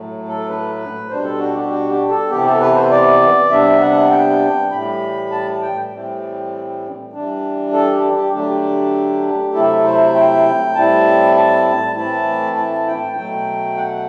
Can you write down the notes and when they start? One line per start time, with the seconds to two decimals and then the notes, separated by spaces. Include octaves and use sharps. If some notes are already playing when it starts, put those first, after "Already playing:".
Already playing: A2 F#3 A3
0.28 A4
0.49 B4
1.09 B2 G3 D4 C5
1.24 A4
1.39 F#4
1.55 G4
1.69 F#4
1.90 G4
2.10 A4
2.30 C3 E3 B3 G4
2.45 A4
2.60 B4
2.75 C5
2.91 D5
3.51 C3 G3 B3 D4 E5
3.81 F#5
4.11 G5
4.72 A2 E3 G3 B5
5.31 A5
5.62 G5
5.92 A2 E3 G3 C4
7.13 E3 G3 D4
7.73 A4
7.93 G4
8.13 G4
8.33 D3 F#3 A3 D4 G4
9.54 C3 F#3 A3 E4 A4
9.84 C5
10.14 G5
10.75 A2 G3 C4 E4 A5
11.36 A5
11.95 A2 E3 A3 C4 E4 A5
12.56 A5
12.87 G5
13.16 B2 F#3 A3 G5
13.77 F#5